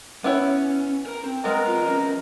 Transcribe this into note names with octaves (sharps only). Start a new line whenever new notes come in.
B3 C#4 E4 C#5
A#4 A#5
C4
G#3 B3 A#4
E2 F4
F3 C#4